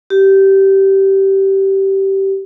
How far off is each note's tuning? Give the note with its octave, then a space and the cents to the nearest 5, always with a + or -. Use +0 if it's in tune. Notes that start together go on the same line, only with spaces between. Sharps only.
G4 -15